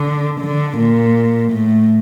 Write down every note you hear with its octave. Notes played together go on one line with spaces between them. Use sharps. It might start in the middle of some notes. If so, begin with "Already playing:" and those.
Already playing: D3
D3
A#2
A2